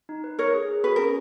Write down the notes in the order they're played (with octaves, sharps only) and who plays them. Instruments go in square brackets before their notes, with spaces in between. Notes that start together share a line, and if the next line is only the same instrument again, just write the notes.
[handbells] D#4
B4
[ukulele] A#4 C#5 [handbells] B4
[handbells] G#4
G#4
[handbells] F#4 [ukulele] B4
[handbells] C#4 [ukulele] A#4